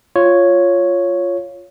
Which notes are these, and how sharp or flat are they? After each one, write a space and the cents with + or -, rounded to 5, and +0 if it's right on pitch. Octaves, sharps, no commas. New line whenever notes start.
F4 +0 C#5 +0